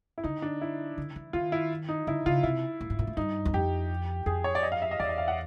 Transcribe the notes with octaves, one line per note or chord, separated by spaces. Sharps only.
E4
D3 D#4
D4
E4
D3
E3
D#3 F4
E4
D#4
D3 E4
C#3 F4
C3 E4
A#2
A2
A#2
A2
G2 D#4
E2
F2 G4
F2 G#4
C#5
D5
D#5
F5
E5
D#5
E2 D5
D#5
F5
F#5